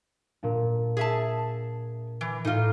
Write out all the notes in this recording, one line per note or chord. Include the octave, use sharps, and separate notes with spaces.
A#2 D4
G#4 E5 A5
E3
A2 D#4 F4